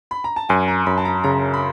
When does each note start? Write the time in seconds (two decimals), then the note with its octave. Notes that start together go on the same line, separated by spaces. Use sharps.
0.11 B5
0.24 A#5
0.36 A5
0.49 F#2 G#5
0.68 A#5
0.86 F#2 B5
0.98 A5
1.05 A#5
1.24 C#3 A#5
1.54 B5